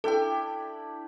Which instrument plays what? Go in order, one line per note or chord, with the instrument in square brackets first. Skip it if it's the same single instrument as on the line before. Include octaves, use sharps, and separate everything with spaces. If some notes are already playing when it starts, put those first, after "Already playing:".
[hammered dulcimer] D4 E4 G4 [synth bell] A4 G5